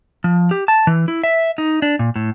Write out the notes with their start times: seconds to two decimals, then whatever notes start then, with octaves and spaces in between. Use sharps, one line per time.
0.24 F3
0.51 G4
0.68 A5
0.87 E3
1.08 E4
1.24 E5
1.58 D#4
1.82 D4
1.99 A#2
2.16 A2